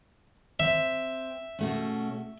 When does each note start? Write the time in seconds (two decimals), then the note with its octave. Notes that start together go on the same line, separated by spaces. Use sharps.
0.60 C4 E5
1.59 B2 A3 C#4